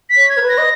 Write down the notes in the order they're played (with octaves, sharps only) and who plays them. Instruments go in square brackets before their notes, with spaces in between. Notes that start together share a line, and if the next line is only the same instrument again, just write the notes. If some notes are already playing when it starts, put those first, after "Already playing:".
[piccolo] B6
[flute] C#5
[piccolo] G#6
[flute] A#4
B4
[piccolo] A#6
[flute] D#5